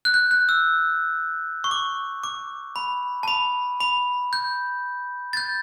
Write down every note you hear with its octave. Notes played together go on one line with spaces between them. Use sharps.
F#6
G6
F#6
E6
C#6
D6
D6
B5
A5
B5
B5
G6
A6
G6